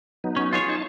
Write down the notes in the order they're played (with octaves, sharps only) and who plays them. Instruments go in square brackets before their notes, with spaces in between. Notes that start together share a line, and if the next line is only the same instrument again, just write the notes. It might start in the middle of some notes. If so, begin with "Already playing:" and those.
[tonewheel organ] F#3 B3 D#4
[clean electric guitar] C#4
F4 G#4 C#5
[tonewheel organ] D#4 A5